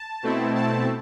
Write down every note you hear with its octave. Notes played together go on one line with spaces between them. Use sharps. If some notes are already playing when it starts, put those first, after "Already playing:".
Already playing: A5
B2 A3 C4 E4
A5